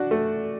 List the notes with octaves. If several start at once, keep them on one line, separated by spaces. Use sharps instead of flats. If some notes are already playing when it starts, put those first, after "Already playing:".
Already playing: D4 F#4
A3